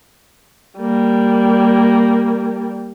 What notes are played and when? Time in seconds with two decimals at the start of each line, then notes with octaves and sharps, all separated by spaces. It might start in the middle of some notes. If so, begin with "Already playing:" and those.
0.79 G3 A#3